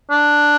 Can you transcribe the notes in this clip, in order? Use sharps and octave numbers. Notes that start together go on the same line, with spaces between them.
D4